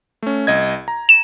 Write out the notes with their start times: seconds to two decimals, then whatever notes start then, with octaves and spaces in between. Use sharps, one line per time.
0.23 A3 C#4
0.47 C2 D#5 G#6
0.88 A#5
1.09 E7